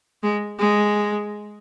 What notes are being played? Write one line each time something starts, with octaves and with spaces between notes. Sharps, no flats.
G#3
G#3